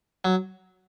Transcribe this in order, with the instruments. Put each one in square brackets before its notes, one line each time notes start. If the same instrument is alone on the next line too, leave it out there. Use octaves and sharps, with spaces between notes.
[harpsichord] F#3